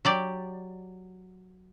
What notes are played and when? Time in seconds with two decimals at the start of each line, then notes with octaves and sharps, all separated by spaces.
0.05 F#3 G4 D5